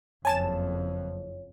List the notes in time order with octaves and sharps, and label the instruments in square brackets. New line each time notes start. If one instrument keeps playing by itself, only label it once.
[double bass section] F#1 F2 [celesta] C#5 [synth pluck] G#5 A5 E7